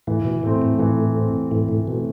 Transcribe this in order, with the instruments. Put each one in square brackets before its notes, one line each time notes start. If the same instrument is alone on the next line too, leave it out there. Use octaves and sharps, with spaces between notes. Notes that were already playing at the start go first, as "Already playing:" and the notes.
[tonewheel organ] A2 [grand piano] E3
[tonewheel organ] B2
[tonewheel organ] A2 [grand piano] A3 C4
[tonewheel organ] A2
[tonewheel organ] A2 [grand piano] E3
[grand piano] A3 C4
[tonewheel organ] A2 [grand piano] E3
[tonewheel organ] A2
[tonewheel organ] B2 [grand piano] A3 C4